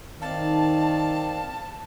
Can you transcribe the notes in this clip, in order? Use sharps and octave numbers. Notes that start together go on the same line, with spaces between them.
D#3 C4 D5 F5 A5